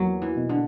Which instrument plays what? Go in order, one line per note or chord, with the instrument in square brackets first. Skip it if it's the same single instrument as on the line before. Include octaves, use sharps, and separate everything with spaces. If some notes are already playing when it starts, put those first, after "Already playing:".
Already playing: [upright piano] E2 A#3 [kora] F#3
[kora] E3
[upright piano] B2
[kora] D3